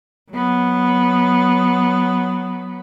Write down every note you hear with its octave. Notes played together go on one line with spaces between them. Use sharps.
F#3 B3